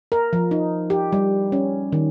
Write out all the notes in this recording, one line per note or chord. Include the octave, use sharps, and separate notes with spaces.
A#4
F3
D#4
G4
G3
C#4
D#3